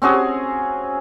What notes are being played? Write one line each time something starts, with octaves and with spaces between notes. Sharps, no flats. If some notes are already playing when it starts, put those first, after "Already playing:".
C4 C#4 F#4 G#4